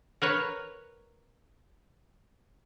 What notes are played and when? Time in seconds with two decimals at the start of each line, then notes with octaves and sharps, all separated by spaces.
0.22 A#4 B4 C#5